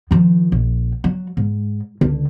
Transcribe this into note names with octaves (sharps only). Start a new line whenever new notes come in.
D#3 F3
A#1
F#3
G#2
C#2 D3